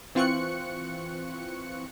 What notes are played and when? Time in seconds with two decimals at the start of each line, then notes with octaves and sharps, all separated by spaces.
0.15 E3 C4 F4 C#6 F#6 C#7